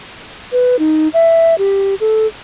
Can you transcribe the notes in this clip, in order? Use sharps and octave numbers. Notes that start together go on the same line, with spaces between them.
B4
D#4
E5
G4
A4